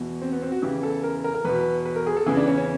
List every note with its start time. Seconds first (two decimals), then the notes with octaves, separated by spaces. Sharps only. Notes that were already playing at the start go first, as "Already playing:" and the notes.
Already playing: E2 B2
0.22 C4
0.32 B3
0.42 C4
0.52 F#4
0.62 E2 C#3 E3 G4
0.83 A4
1.03 A#4
1.24 A#4
1.34 A#4
1.45 E2 B2 B4
1.85 B4
1.96 A#4
2.06 G#4
2.17 A4
2.26 E2 C#3 E3 G#4
2.37 D4
2.47 C#4
2.57 C#4